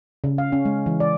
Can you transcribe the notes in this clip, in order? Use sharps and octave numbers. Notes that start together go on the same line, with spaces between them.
C#3
F5
C#4
G#3
E3
D5